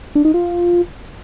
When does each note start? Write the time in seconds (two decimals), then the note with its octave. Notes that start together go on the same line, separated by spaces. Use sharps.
0.15 D4
0.25 D#4
0.34 F4